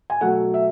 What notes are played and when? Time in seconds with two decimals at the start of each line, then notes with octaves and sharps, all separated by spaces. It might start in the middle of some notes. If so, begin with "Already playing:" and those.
0.10 G#5
0.21 B2 F#3 A3 F#5
0.54 E5